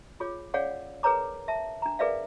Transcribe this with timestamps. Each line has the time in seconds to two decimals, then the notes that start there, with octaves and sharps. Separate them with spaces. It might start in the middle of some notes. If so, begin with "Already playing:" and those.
0.20 F4 G#4 C#5 D6
0.54 C#4 G#4 C#5 D5 F5 F#5
1.03 G#4 A#4 B4 C#5 A#5 D6
1.48 E5 A5
1.82 D4 A#5
1.99 G#4 A#4 B4 D5 E5 F5